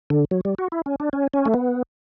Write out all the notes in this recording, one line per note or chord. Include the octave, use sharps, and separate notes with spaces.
D3
F#3
G3
F#4
E4
C#4
D4
C#4
C#4
A3
B3